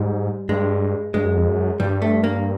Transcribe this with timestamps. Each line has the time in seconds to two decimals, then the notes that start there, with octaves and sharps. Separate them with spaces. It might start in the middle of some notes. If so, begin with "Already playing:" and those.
Already playing: G#2 G3
0.49 G2 G#3
1.14 G2 G#3
1.25 F#2
1.37 F2
1.48 F#2
1.80 G2 G3
2.02 A3
2.24 A#3